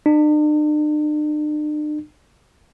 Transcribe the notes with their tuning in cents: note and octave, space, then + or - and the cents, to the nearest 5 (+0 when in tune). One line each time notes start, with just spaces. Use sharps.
D4 +45